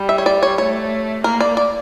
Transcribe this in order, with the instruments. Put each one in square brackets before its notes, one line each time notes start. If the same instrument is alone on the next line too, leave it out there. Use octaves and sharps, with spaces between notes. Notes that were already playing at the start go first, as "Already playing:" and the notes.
Already playing: [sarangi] G3
[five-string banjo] E5
C#5
D5
C#5
[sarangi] A3 [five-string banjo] C#5
[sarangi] A#3 [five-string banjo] A#4
[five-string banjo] D5
D5